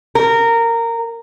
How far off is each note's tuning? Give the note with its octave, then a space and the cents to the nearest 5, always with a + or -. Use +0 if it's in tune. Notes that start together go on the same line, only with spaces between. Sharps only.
A#4 -15